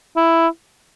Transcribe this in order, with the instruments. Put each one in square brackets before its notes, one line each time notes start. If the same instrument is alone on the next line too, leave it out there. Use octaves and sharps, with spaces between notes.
[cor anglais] E4